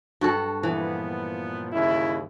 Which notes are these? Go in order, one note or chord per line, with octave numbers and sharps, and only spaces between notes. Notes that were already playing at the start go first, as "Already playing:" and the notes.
G2 F#4 A4
A#2 E3 F3 B3
D#2 C#3 E4